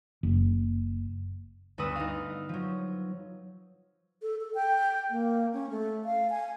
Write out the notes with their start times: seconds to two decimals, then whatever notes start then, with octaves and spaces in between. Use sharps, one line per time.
0.23 F#1
1.78 D2 G2 B3 B4 D#6 E6
1.96 D#4 F5
2.49 F3 F#3
4.22 A4
4.41 A4
4.55 G5
5.10 A#3
5.53 C#4
5.70 A3
6.05 F5
6.30 G#5